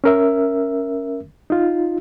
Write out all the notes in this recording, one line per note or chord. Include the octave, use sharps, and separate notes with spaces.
C#4 A#4 E5
D#4 F4